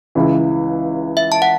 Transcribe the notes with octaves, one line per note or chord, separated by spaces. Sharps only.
C#2 C#3 E3
E5
A5
F#5